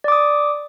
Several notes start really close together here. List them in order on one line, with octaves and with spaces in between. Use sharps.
D5 D6 D#6